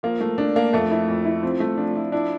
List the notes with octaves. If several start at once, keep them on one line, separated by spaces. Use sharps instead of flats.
F3 A#3
A3
A3 D4
A#3 D4
F2 A3
E4
F2
E4
F3 C4
A3
F3 D4
F3 E4
D4 E4